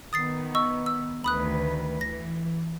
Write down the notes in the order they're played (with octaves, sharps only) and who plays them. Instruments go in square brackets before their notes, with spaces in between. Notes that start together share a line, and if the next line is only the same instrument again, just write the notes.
[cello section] D#3 B3 [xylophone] D#6 A6 C7
[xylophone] D#5 C#6 E6
E6
[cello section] D2 D#3 B4 [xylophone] B5 D#6 F#6
[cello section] E3 [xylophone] A#6